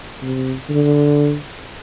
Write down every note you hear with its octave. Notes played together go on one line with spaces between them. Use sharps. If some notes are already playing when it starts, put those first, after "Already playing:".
C3
D3